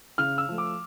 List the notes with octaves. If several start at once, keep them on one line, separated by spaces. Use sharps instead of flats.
C#3 F6
E6
F3 A3
D6